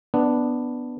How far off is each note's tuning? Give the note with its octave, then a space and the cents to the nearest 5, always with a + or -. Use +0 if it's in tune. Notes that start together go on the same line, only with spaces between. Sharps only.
B3 +0 D4 +5